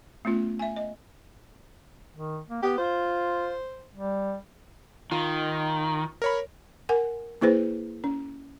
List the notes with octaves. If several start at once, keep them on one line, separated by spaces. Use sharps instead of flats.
A3 B3 C#4 F4
E5 G#5
D#5
D#3
A#3
B3 G4
F4 C5
G3
D#3 F4
A#4 C#5 B5
A#4 F#5 G#5
A#3 E4 G#4 B4 C5
C#4